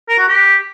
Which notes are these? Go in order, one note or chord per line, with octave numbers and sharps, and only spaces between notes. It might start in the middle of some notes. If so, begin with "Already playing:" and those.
A#4
F#4
G4